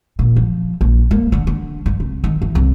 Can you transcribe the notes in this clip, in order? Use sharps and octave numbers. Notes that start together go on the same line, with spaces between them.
A#2
F3
A#1
A#3
D3
D3
G2
C2
D#3
E3
C2